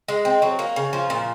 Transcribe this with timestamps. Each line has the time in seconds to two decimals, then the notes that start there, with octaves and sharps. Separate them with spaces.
0.08 G#3
0.25 C4
0.42 F#3
0.59 A#3
0.76 C#3
0.93 F3
1.10 A#2